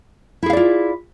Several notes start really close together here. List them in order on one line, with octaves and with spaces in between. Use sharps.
E4 G#4 F5 D5 F4